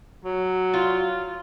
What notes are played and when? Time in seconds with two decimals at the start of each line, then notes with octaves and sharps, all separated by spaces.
0.25 F#3
0.74 F4